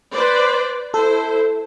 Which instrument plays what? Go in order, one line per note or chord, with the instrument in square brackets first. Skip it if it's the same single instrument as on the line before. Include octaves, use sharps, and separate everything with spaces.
[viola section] B4 C5 D5
[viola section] E4 C5 [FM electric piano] A4